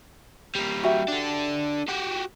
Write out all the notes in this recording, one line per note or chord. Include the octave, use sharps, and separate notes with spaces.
G3 A#3
F#4 G4 E5
D4 A4
F#4 G4